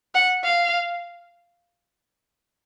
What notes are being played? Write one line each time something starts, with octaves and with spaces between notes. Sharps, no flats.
F#5
F5